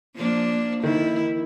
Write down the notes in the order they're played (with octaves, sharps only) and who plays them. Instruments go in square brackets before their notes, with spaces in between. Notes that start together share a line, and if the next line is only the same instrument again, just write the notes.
[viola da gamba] F3 A#3 D4
[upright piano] D#3 [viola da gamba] E4